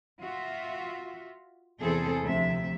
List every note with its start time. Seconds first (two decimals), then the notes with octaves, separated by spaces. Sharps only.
0.20 F4 F#4 E5
1.80 E2 C3 C4 E4 G#4 A4
2.23 D2 C3 F3 E5